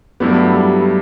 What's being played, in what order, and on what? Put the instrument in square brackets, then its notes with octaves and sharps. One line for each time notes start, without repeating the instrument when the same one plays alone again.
[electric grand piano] G2 F#3 A3 E4 G4 [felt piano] B3
[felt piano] G3